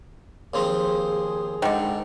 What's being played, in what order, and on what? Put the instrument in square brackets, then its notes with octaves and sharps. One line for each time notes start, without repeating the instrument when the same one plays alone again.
[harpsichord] D#2 F3 C4 [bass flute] G#4
[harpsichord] G#2 [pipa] D3 D#3